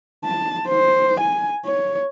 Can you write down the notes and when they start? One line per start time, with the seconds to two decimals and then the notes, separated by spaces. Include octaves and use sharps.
0.24 A5
0.68 C5
1.20 G#5
1.65 C#5